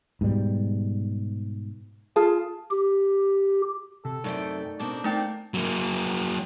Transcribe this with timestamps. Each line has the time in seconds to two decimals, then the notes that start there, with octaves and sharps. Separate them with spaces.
0.21 G#2 B2 G3
2.16 F4 G#4 A5
2.71 G4
4.05 C3 A4
4.24 F#2 C3 A3 D#4 D5 G5
4.79 B2 A#3 C4 D4
5.04 A3 A#3 C4 D#4 G5
5.54 F#3 A#3